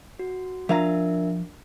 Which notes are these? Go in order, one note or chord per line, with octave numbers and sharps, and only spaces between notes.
F#4
F3 D4 A#4 E5 F5 A#5